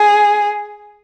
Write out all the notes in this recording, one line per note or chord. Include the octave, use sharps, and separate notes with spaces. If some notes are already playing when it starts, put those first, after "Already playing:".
Already playing: G#4